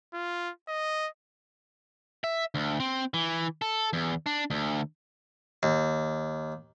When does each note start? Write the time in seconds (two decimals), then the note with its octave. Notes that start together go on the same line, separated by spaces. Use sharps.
0.14 F4
0.68 D#5
2.24 E5
2.55 D2
2.80 C4
3.14 E3
3.62 A4
3.93 E2
4.26 D4
4.50 D2
5.63 D#2